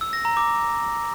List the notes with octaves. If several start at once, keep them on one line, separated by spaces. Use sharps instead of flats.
E6
A#6
A#5
D6